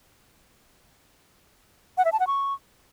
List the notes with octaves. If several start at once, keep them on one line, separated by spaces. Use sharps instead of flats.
F#5
E5
A5
F#5
C#6